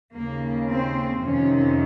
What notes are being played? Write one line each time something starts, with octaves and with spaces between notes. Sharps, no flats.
D#2 C#3 A#3
C4
F2 C3 D#3 C#4